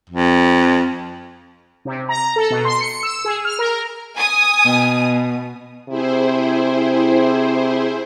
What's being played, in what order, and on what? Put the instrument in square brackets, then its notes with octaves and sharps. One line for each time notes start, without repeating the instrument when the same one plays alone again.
[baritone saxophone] F2
[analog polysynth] C3
A#5
A4
B2
C6
C#7
E6
G#4
F6
A#4
[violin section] G#5 D#6
[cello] B2
[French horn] C3 [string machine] E4 G#4 C5